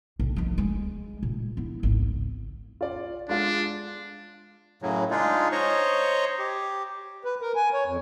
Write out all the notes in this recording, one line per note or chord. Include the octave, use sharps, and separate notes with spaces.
B1
D#3 F3
G#3
A#2
B3 E4
G#1 C#2
F4 D5
G#3 D4 F4
F#2 A2 C#3 F#3
G#3 D4 D#4 F4 G#4
C5 C#5 D#5 A#5 C#6
G4
B4
A#4
G#5
C#5
F2